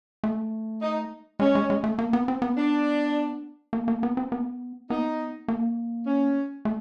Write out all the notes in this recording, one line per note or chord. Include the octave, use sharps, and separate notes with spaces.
A3
D#4
G#3 C#4
G#3
G#3
A3
A#3
B3
C4
B3
D4
A#3
A#3
B3
C4
B3
B3 D#4
A#3
C#4
A3